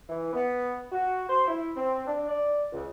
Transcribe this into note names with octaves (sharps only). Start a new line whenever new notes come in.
E3
B3
F#4
C5
E4
C4
D4
D5
C#2